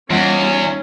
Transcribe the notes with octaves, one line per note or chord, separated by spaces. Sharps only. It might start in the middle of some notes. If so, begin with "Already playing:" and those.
E2 E3 G3 C#4 F4 F#5 E6 D7
D#4